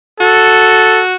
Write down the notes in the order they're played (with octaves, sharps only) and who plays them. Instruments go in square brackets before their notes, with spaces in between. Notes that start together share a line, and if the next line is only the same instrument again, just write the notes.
[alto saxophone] F#4 [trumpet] A4